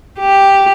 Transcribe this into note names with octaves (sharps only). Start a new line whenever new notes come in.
G4